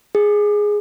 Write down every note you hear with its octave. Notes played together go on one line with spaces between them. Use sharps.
G#4